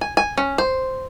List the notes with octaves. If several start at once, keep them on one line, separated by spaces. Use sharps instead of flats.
G#5
G#5
C#4
C5